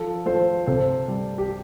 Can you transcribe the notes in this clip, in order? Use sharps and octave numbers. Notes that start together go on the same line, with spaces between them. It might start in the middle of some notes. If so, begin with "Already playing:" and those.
Already playing: F3 A4
F3 A4 C5
C3 A4 C5
G3
G4